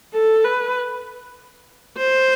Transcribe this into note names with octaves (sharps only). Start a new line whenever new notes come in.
A4
B4
C5